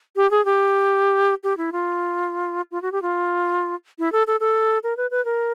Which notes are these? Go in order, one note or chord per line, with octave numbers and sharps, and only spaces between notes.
G4
G#4
G4
G4
E4
F4
F4
F#4
G4
F4
E4
A4
A4
A4
A#4
B4
B4
A#4